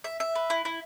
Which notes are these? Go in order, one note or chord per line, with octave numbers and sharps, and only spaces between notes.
E5
E5
B4
E4
E4